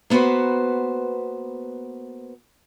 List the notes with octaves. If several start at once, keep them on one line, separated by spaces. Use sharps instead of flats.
A#3 B3 F#4 B4 C5